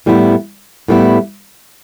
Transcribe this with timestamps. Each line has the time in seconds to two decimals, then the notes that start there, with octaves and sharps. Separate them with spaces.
0.06 A2 G3 B3 E4
0.88 A2 G3 B3 E4